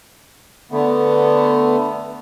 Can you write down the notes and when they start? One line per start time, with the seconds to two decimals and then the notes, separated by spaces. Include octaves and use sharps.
0.72 D3 A3 B3